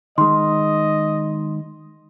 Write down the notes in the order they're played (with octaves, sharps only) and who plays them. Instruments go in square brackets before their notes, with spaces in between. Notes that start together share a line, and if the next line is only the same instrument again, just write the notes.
[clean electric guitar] D#3 G#3 [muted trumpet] D#5 [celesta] C6